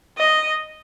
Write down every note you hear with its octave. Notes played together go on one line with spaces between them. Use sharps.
D#5